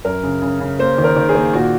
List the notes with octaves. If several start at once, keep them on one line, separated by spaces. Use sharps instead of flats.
F#2 A#4
C#3
C#3
C#3
A#3 C5
D#3
A#4
D#3
G#4
A#3
A#2 F#4